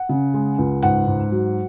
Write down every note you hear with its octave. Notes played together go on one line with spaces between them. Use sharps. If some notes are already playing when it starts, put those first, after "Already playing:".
Already playing: F#5
C#3
G#3
C#2
G#2 F#5
G#2
F#3